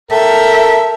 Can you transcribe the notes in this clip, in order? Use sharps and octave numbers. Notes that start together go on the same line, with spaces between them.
A4 A#4 E5 G5